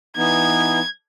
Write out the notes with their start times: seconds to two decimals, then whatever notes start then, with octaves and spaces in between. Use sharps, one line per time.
0.17 E3 B3 D#4 G#6